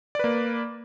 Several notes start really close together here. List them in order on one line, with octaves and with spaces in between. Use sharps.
D5 B4 A#3